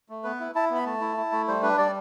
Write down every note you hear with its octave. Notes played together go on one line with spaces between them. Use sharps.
A3
B3 B4
E4
E4 A5
B3 B5
A3 A5
E4
E4
A3
G3 C5
D4 B4
G3 D5